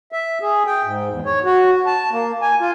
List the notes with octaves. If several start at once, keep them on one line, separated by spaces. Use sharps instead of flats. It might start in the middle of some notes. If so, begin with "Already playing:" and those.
E5
G#4
G5
G#2
E2
C#5
F#4
A5
A#3
G#5
F4